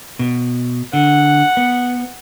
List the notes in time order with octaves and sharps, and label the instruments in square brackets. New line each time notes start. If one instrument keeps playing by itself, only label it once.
[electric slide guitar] B2
[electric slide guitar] D3 [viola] F#5
[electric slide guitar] B3